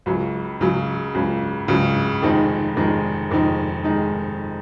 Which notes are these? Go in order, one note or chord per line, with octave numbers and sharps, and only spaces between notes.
C#2 C#3 F#3
C#2 C#3 F#3
C#2 C#3 F#3
C#2 C#3 F#3
F1 F2 D#3 G#3 D#4
F1 F2 D#3 G#3 D#4
F1 F2 D#3 G#3 D#4
D#3 G#3 D#4